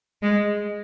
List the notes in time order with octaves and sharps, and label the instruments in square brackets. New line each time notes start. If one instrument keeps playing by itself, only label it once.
[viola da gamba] G#3